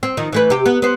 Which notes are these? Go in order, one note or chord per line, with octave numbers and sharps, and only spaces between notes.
C4
D#3 F3
E3 A3 B4
C3 G4
B3
B3 C5